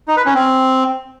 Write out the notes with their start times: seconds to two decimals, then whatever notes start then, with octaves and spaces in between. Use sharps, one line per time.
0.08 D#4
0.17 B4
0.26 C#4
0.35 C4